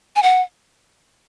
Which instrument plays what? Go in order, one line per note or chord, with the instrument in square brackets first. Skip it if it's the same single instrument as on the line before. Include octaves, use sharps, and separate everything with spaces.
[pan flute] G#5
F#5